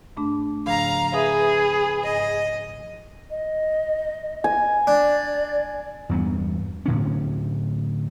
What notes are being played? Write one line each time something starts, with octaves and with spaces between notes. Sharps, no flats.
G#2 A3 D4
G#2 C#3 F3 F5 A#5
G#4 B4 E5 D#6
G#2 D#5
D#5
G#5
D4 D5
E2 G2 B3
A2 D3 C#4